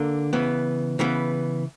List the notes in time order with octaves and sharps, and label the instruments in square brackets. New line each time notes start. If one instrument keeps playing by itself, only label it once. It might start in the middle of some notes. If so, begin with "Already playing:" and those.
Already playing: [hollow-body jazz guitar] D3 A#3
C#3 E3 B3
C#3 E3 B3